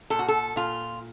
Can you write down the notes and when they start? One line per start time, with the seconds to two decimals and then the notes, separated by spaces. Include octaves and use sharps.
0.10 A#2 A4
0.19 F#4
0.28 A4
0.56 A#2 F4